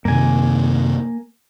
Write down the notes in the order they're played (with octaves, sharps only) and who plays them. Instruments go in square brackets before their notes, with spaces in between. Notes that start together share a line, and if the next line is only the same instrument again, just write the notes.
[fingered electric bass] F#2 C3 D#3 [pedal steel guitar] A#3 G#5